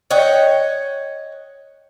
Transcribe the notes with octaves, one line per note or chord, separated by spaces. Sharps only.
C#5 D#5 F#5 G5